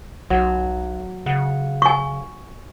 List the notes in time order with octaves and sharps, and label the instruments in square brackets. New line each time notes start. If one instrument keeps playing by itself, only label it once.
[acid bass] B1 [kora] F#3
[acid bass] C#3 [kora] F#5
[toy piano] G#5 C#6